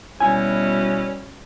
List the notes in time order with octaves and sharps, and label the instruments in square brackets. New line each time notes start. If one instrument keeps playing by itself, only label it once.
[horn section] B2 E4 [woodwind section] G3 F#4 [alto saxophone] C#4 [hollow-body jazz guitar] G#5